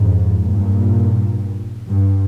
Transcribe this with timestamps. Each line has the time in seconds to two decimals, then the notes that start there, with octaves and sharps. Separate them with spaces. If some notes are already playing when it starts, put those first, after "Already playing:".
Already playing: F2 G#2
0.42 G2 A#2
1.88 G2